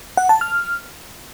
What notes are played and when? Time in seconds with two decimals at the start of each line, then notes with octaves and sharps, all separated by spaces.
0.17 F#5
0.29 A5
0.41 F6